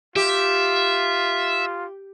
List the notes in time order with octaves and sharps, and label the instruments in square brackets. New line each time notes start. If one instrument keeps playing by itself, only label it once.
[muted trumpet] F4 [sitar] G4 [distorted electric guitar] E5